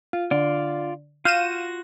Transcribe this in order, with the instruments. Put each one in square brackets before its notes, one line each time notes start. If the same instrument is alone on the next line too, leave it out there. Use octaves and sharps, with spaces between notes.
[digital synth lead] F4
[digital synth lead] D3 [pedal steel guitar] F4 D5
[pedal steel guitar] F4 F#4 G6 [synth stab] F5 D#7 E7 [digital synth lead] A#6